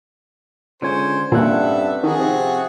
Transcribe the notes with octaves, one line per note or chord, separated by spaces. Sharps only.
C#2 D3 C5 C#5 G#5
G2 A#2 C4 C#4 A4 E5 F#5
D#3 F3 F#4 G#4
C3